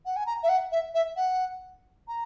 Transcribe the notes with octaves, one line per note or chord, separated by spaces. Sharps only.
F#5
G#5
A#5
E5
F#5
E5
E5
F#5
A#5